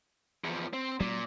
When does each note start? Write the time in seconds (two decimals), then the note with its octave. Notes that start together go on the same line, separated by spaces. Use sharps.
0.44 E2 F3
0.73 C4
1.00 A#2 F#3 G#3 C#4